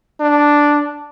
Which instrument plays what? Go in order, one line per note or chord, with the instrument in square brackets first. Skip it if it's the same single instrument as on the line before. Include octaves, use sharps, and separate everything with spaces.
[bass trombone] D4